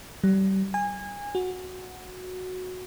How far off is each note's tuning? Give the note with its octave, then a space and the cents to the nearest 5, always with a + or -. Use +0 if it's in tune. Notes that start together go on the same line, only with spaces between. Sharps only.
G3 -30
G#5 -25
F#4 -10